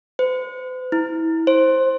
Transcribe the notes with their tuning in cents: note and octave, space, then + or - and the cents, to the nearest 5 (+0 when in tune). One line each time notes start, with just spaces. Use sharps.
C5 -45
E4 -25
C5 +10